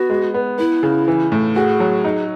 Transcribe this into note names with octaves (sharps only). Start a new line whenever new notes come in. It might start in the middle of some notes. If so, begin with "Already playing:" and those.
Already playing: B3 F#4
G#3
B3
B3 E4
C#3
E3
A2
F#4 G#4
F#3
D#4